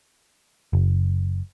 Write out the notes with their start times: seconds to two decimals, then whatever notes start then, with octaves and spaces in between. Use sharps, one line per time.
0.73 F#1